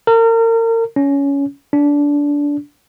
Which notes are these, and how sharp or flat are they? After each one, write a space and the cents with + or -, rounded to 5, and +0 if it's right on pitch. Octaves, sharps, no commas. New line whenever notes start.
A#4 -35
C#4 +15
D4 -20